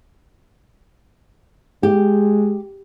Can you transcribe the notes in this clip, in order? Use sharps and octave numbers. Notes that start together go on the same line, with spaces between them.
G#3 G4